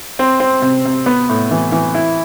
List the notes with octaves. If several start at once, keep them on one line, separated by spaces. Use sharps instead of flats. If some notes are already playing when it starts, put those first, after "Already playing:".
C4
C4
C3
C3
B3
A2
E3
E3
E4